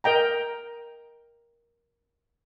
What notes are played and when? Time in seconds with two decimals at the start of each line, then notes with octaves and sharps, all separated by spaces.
0.04 A#4 D#5 G5 A#5